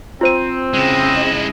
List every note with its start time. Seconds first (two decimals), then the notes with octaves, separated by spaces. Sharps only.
0.21 C4 F4 C5 D#7
0.73 C#3 G#3 E4 D#5